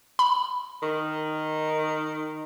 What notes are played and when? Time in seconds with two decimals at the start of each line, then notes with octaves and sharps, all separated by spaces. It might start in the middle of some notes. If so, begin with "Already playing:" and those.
0.19 B5
0.83 D#3